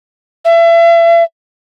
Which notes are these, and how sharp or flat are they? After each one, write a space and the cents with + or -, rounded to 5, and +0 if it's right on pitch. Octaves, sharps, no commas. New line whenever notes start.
E5 +35